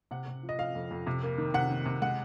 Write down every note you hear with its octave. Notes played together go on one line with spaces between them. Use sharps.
C3 F#5
C3
F3
D#5
F3 F5
F2
F2
C3
A#3
D#3
C3 F#5
D#3
C3
G#3 F#5